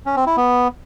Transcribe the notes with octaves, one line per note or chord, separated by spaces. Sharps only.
C#4
C4
E4
B3